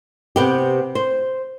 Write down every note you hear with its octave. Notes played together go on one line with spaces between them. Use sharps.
C3 B3 G4
C5